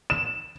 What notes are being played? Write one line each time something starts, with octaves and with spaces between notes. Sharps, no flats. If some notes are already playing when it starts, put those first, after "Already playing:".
E7